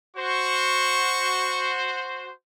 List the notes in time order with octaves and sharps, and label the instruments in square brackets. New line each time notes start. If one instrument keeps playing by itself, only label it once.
[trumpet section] F#4 C5 [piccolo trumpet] C#6